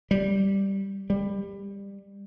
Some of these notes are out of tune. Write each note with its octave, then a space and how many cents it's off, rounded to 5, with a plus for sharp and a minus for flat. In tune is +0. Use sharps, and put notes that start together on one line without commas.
G3 +0
G3 +20